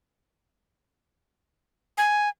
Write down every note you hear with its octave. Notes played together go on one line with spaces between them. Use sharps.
G#5